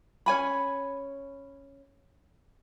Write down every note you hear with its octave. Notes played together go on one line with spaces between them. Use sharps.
C#4 C#5 G#5 B5